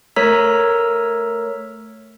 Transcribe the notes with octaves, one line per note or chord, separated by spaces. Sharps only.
A3 A#4 C#5 A#5 E6 B6